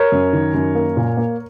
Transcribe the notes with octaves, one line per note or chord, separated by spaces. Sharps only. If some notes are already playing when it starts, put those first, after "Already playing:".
Already playing: A#4 C#5
F#2
D#3
F#2
A#3
A#2
A#3